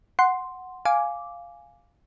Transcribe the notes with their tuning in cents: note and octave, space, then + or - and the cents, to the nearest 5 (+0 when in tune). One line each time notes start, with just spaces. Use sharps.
F#5 +0 C6 +0
F5 +0 G#5 +0 D6 -10